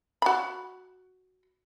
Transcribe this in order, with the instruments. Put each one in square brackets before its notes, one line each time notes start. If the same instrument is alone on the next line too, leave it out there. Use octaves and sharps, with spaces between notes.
[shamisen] F#4 B5